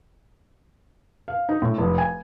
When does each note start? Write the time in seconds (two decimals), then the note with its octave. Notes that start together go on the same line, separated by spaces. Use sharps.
1.28 F5
1.49 D#4
1.62 A2
1.78 F1
1.98 G#5